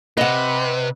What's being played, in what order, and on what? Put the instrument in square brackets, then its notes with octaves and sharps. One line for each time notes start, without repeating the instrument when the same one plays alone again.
[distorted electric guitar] C3 [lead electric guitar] B4 [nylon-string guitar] D#5 F#5